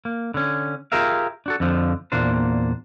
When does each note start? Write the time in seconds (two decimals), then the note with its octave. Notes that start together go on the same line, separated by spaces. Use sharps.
0.05 A#3
0.34 D3 C#4
0.92 F4 G4 G#4 A#4 E5 F5
1.46 D4 F#4 A4
1.60 F2 D3 F3
2.12 E2 A#2 A#3 D4 C5